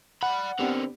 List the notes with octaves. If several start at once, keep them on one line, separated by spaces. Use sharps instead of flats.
D5 F#5 B5
D3 B3 C4 D4 G4 A#4